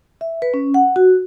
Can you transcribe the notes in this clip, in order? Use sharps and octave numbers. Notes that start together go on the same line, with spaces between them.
E5
B4
C#4
F#5
F#4